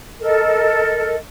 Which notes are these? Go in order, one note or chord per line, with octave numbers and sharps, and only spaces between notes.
A4 A#4 D#5